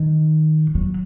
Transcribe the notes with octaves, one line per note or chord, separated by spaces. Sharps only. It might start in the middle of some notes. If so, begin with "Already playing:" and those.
Already playing: D#3
F#3